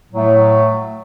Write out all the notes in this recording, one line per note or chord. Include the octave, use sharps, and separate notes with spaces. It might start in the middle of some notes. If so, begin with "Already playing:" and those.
A2 F#3 A3